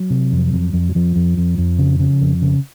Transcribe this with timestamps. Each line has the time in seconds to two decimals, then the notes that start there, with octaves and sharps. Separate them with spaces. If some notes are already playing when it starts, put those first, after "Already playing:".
Already playing: F#3
0.10 C3
0.32 F2
0.53 F2
0.73 F2
0.89 F#3
0.95 F2 F3
1.16 F2
1.37 F2
1.58 F2
1.79 C#3
1.99 C#3
2.21 F2
2.42 C#3